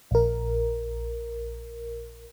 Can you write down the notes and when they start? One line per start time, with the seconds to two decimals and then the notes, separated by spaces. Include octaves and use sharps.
0.11 A#1 A#4